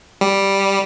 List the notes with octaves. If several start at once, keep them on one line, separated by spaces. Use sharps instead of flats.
G3